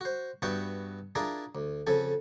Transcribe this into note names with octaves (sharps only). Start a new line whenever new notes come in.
F#4 C5
G2 B3 F#4 E5 G5 C#6
D4 E4 F4 G#4 A#4
D2
F2 C#3 A4 G#5